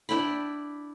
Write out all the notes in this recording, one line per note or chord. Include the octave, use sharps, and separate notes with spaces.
D4 E4 G5 B5